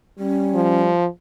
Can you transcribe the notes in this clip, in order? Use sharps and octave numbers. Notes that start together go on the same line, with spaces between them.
G3 C#4
F3